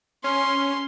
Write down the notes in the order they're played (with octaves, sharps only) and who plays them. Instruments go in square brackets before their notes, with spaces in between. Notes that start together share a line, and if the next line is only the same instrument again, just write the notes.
[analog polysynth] C#4 [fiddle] C6